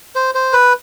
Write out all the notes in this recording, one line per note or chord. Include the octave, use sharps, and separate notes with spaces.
C5
C5
B4